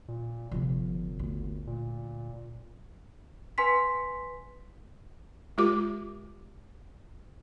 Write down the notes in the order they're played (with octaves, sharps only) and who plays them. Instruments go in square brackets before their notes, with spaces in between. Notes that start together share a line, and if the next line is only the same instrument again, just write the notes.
[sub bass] A#2
[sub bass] G1 [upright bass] C3 F3
[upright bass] D2
D2
[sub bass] A#2
[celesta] B4 G#5 C6 B6
[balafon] G#3 F4 G4 A#4 D6